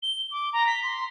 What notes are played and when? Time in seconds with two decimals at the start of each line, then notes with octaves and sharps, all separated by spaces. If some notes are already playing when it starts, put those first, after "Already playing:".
0.02 G7
0.31 D6
0.53 A#5
0.67 B6
0.83 C6